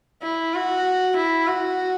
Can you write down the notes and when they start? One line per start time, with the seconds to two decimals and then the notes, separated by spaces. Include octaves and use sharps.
0.22 E4
0.54 F#4
1.16 E4
1.48 F#4